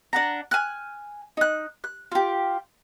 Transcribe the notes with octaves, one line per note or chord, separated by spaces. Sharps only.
D4 F#5 A#5
G#5 F6 F#6
D#4 F#6
F#6
F4 G4